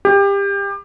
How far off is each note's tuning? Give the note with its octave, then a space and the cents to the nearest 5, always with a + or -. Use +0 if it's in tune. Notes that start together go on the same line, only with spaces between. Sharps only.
G4 +25